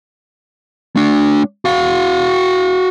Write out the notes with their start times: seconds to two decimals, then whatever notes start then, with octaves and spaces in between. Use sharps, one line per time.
0.96 A3 D4
1.65 F#4 F5